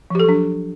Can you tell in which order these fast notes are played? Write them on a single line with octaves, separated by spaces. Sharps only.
F3 G4 A4 F#3 D4